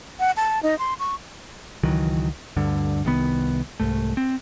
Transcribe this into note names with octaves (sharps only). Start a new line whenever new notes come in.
F#5
A5
D#4
C6
C#6
C#2 D#3 E3 F#3
D2 G2 D3
C2 D#3 B3
C2 G#2 A3
C4